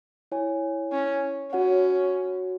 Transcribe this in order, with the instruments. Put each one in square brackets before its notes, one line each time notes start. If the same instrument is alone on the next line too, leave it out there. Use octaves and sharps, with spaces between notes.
[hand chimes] E4 C#5 G#5
[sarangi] C#4
[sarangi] C#4 [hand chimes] F#4 C#5 F#5